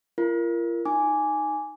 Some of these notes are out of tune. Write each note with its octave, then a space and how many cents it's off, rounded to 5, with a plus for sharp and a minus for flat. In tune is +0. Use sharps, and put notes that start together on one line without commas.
F4 -40 A#4 -5
D#4 +0 G#5 +0 D6 -15